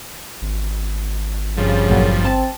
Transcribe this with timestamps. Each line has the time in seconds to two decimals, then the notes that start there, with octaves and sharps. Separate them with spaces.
0.42 G#1
1.57 G2 C#3 F3
1.87 B1 A#2 F#3
2.25 C4 A5